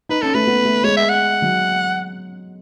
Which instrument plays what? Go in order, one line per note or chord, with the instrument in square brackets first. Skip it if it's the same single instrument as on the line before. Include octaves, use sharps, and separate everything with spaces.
[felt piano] D#4 [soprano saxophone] B4
[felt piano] C#4 [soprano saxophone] A4
[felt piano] A3 [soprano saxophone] B4
[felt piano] B3
A3
[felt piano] G#3 [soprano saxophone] C#5
[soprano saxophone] E5
F#5
[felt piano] F#3